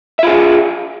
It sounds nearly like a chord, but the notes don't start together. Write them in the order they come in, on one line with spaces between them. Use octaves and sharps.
E5 F4 G#4